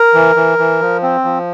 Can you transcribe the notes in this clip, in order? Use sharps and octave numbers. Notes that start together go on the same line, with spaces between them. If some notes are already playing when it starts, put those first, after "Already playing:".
Already playing: A#4
E3
E3
E3
F3
C4
F3